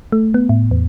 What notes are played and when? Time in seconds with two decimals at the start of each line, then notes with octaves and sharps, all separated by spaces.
0.12 A3
0.34 B3
0.49 A2
0.71 E2